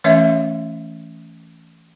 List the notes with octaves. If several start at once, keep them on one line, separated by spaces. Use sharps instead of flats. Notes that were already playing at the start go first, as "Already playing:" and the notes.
E3 A3 C#4 C#5 E5